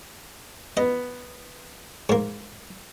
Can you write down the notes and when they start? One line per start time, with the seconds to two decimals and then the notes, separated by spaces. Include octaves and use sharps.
0.77 B3 D#5
2.09 G#2 A#3